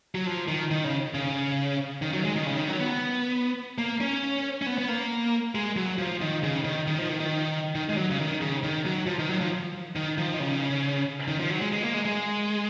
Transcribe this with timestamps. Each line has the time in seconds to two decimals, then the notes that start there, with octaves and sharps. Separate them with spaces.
0.15 F#3
0.27 F3
0.48 D#3
0.71 D#3
0.84 C#3
1.14 C#3
2.02 D#3
2.13 F#3
2.25 G#3
2.36 D#3
2.46 C#3
2.57 D#3
2.68 F#3
2.80 B3
3.78 A#3
4.01 C#4
4.62 C#4
4.66 B3
4.78 B3
4.88 A#3
5.55 G#3
5.77 F#3
5.98 F3
6.21 D#3
6.43 C#3
6.64 D#3
6.87 D#3
6.98 F3
7.09 D#3
7.20 D#3
7.75 D#3
7.89 G#3
7.97 F#3
8.11 C#3
8.20 D#3
8.41 C#3
8.63 D#3
8.86 F#3
9.07 F3
9.19 D#3
9.29 F#3
9.40 F3
9.96 D#3
10.18 F3
10.34 D#3
10.40 C#3
11.28 D#3
11.39 F3
11.49 F#3
11.61 G#3
11.72 G#3
11.83 A#3
11.94 G#3
12.05 G#3